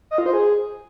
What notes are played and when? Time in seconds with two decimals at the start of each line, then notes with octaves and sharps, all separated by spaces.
0.11 D#5
0.18 F4
0.26 C5
0.33 G#4